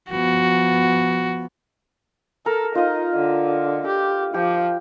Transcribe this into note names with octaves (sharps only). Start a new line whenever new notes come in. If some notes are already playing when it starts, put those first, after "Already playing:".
F3 B3 F#4
A4 A#4
D#4 F4 D#5
D3
G4
F3 G4